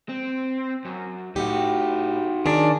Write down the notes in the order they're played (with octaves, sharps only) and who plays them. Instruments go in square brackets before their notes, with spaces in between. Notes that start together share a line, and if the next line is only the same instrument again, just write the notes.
[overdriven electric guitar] C4
F#2
[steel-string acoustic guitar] A2 G4 [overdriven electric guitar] D#4 F#4
[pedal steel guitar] D#3 D4 [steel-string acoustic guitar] C#4 G#4